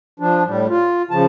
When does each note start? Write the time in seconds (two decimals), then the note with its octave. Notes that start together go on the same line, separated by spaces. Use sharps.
0.20 F3 D4
0.47 A2 G3
0.69 F4
1.11 C#3 F3 A5